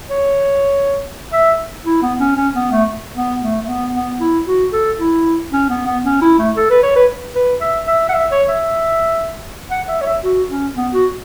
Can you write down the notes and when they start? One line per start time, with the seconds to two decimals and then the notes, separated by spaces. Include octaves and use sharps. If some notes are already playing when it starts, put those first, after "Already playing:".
0.10 C#5
1.33 E5
1.85 E4
2.02 B3
2.20 C#4
2.37 C#4
2.55 B3
2.72 A3
3.16 B3
3.42 A3
3.62 A3
3.68 B3
3.94 B3
4.20 E4
4.47 F#4
4.73 A4
5.00 E4
5.52 C#4
5.69 B3
5.86 B3
6.04 C#4
6.21 E4
6.39 A3
6.57 A4
6.70 B4
6.83 C#5
6.96 B4
7.35 B4
7.61 E5
7.87 E5
8.09 F#5
8.14 E5
8.31 C#5
8.48 E5
9.71 F#5
9.88 E5
10.01 C#5
10.06 E5
10.24 F#4
10.50 C#4
10.76 B3
10.93 F#4